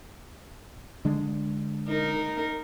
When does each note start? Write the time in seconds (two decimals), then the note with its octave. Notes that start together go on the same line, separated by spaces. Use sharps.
1.05 D3 G#3 D4
1.88 D#4 A#4